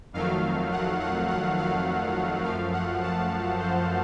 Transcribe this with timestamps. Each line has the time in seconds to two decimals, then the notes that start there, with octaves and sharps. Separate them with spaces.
0.13 F2 D#3 F#3 A3 F5
0.71 F#5
1.00 F#5
1.28 F#5
1.58 F5
2.44 F#2 F3 A3 F5
2.73 F#5
3.02 A5
3.59 C5